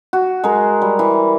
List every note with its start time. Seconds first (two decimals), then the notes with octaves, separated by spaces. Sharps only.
0.13 F#4
0.44 G#3 A#4
0.82 G3
0.99 E3